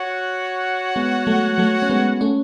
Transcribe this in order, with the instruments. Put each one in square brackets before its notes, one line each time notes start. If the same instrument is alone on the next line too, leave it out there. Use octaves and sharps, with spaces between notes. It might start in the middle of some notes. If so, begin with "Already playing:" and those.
Already playing: [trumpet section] F#4 C#5 F#5
[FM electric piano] G#3 B3
F#3 A3
F#3 A3
C#4
G#3 B3
A3 C#4